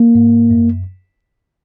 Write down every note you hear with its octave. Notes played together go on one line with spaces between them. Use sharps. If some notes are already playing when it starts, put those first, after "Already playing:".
Already playing: A#3
G#2
F#2